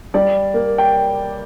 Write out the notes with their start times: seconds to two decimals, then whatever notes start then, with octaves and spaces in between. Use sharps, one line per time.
0.14 G3 D5
0.54 A#3
0.78 G5